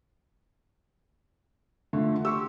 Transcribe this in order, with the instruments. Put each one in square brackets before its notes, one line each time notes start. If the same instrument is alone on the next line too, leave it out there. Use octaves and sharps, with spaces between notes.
[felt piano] D3 D4 F4 [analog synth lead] A3
[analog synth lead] G4 [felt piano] C6 C#6 E6